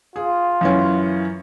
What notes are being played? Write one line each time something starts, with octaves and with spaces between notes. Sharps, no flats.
F4 G#4
F#2 E3 C#4